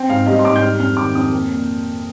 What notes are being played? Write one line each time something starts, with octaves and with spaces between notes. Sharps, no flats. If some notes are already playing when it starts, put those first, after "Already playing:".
Already playing: C4 G5
G#2 F5
G3 D#5
C6
G#2 D6
G6
G3 F6
F2 F6
D#3 D6
F2 D#6
A#3
A#2